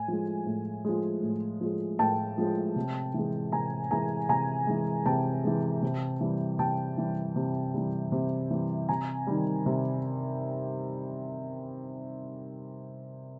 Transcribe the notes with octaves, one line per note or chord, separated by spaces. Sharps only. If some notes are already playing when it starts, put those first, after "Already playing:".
Already playing: A2 G#5
F3 G#3
A2
F3 G#3
A2
F3 G#3
A2 G5 A5
F3 G#3
C3
E3 G#3
C3 G#5 A#5
E3 G#3 G#5 A#5
C3 G#5 A#5
E3 G#3
C3 G5 A5
E3 G#3
C3
E3 G3
C3 G5 A5
E3 G3
C3
E3 G3
C3
E3 G3
C3 G#5 A#5
D#3 G3
C3